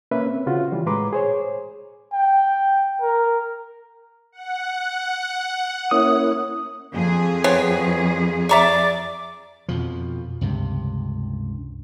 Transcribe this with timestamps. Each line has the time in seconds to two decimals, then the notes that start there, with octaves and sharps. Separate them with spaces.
0.11 A#3 C#4 B4 E5
0.27 C4
0.46 C#3 F4 F#4
0.72 E3 G3
0.86 A2 G#3 B4 A#5 C6 D6
1.13 G#4 C5 C#5
2.13 G5
3.01 A#4
4.32 F#5
5.91 A#3 C#4 E4 D#6
6.94 F2 G#4
7.44 B3 C4 C#5
8.49 D5 E5 A#5 C#6 D6
9.69 F2 B2 F3
10.41 C#2 G2 C3